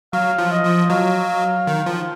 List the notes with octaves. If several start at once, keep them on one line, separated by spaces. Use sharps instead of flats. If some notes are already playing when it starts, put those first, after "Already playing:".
F#3 F5
F3
D#5
F3
F#3 F5
D#3
F3